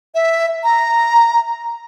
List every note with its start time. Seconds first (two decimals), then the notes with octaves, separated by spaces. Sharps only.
0.15 E5
0.64 A#5